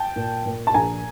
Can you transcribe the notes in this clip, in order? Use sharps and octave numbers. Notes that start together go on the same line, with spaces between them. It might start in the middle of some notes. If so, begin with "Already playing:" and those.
Already playing: G5 A5
A#2
A#2
A5
A#1 G#5 A#5